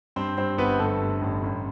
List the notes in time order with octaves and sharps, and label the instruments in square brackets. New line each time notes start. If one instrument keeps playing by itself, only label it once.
[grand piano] G2 C4 C5
G2 C4 C5
G1 B3 B4
G2 A3 A4
G2
A1
A1